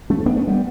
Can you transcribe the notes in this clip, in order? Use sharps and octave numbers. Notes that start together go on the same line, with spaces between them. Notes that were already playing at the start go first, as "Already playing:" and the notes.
A3 C#4
B3 D4
A3 C#4
G3 B3